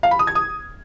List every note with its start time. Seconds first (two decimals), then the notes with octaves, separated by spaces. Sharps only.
0.03 F5
0.11 B5
0.19 D#6
0.27 G#6
0.35 D#6